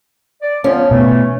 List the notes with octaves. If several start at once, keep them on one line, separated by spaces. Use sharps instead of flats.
D5
F3 B3 C#4
B2 E3 A3